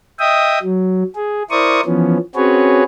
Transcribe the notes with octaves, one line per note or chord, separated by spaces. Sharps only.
D#5 E5 G5 D#6
F#3
G#4
E4 A#4 C5 D5 C#6 D#6
E3 F3 B3 C#4
C4 C#4 F#4 G#4 B4 C#5